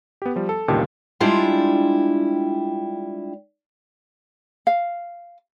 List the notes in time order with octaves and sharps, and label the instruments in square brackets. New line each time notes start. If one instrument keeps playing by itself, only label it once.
[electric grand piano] B3 G4
F3 G3
A4
G1 C#2 A#2 D#3 G4 A5
[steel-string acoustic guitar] G3 G#3 D4 E4 F4 G5
[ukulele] F5